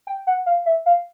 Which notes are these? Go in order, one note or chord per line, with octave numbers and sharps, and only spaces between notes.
G5
F#5
F5
E5
F5